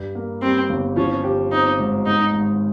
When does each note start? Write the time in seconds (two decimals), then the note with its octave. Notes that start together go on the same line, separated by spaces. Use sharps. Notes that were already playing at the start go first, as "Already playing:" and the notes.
Already playing: G2
0.15 A#3
0.42 G3 C4
0.70 G1
0.96 F3 C#4
1.24 G4
1.51 C4 D#4
1.79 G#2
2.06 G#2 D#4
2.33 G#1